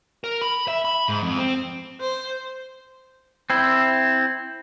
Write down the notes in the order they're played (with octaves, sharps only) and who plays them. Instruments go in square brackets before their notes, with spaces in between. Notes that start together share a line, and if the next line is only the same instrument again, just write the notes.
[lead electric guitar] A#4
B5
E5
B5
G#2
F2
C4
[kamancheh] C5
[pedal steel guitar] C4 E4